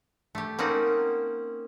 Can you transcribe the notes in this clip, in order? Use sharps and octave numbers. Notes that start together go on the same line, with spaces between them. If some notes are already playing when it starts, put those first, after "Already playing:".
A3 G4
A#3 C4 C#4 D#4 F#5